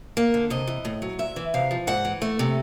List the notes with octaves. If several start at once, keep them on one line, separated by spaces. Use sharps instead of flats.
A#3
D3
C3 D#5
E3
A2
F#3
C3 E5
E3
C3 F5
F3
G#2 F#5
E3
A3
C3